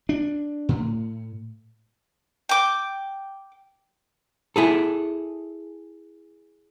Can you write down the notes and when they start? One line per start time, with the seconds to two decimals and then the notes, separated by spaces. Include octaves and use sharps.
0.09 D4
0.69 A2
2.49 G5 D6
4.56 E4 G#4 A4